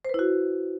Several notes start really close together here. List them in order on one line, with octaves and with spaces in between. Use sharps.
C5 B4 E4 F#4